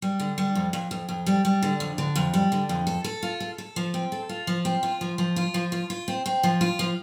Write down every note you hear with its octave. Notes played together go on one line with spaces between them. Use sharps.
G3
D3
G3
F2
F2
F2
F2
G3
G3
D3
F2
D3
F2
G3
D3
F2
A4
A4
F4
A4
A4
F3
C4
A4
F4
F3
C4
F4
F3
F3
F4
F3
F4
F4
C4
C4
F3
F4
F3